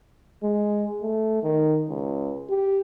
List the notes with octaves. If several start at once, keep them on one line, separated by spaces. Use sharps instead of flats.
G#3
A3
D#3
C#2
G4